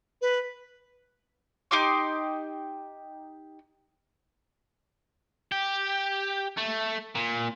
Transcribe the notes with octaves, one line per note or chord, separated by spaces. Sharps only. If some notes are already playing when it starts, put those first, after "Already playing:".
B4
D#4 G4 C6 D6
G4
A3
A#2